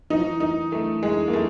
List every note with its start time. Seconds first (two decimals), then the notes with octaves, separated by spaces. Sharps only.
0.10 E3 D#4
0.18 F3
0.25 E3
0.40 D#4
0.72 A3
1.03 G#3
1.28 A#3
1.33 A3